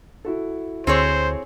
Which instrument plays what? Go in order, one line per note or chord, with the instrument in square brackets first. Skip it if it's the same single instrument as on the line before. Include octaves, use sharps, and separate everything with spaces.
[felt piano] E4 F#4 A4
[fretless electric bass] D2 [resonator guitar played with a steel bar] C4 G#4 C#5 [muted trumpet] C5